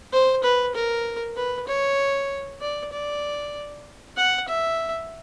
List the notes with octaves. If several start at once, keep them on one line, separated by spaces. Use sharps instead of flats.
C5
B4
A#4
B4
C#5
D5
D5
F#5
E5